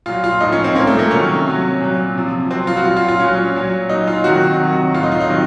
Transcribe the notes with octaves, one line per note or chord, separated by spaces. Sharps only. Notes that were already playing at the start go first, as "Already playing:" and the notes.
A#2 F#3 F4
F4
A2 F3 D#4
C#4
C4
A#2 F3 A#3
A3
A#3
C3 D#3 F#3 C#4
C3 F#3
A#2 F#3
C3 F3
C3 F#3 C4
F4
F#4
A#2 F#3 F4
F4
F4
A#2 F#3 C#4
A#2 F#3
A#2 F#3 D#4
F4
C3 D#3 F#3 F#4
C3 D#3 F#3
A2 F#3 F4
D#4
F4
D#4
C3 D#3 F#3